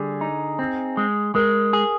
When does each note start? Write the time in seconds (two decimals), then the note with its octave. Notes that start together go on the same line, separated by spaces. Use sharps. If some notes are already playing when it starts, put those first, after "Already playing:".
Already playing: D3 G3 G#4
0.21 D#4
0.59 C4
0.97 G#3
1.35 G#3 A#4
1.73 G#4